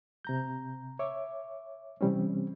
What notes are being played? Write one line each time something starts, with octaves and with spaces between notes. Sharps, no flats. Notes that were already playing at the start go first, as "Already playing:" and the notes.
C3 A#5 G6
C#5 E5 D6
C3 E3 G3 C4 C#4